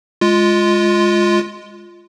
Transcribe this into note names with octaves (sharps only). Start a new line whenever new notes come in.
G#3 F4